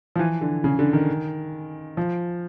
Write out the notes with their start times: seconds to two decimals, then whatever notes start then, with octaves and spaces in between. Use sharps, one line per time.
0.16 F3
0.19 E3
0.41 D3
0.64 C#3
0.79 D3
0.93 D#3
1.97 F3